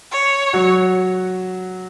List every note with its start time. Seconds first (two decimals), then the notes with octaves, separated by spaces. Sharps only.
0.12 C#5
0.53 F#3 F#4